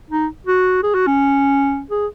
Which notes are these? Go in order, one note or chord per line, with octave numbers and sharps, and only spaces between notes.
D#4
F#4
G#4
F#4
C#4
G#4